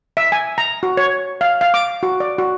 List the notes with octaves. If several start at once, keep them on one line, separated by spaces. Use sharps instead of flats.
E5
G#5
A#5
F#4
C#5
F5
F5
D6
F#4
D5
F#4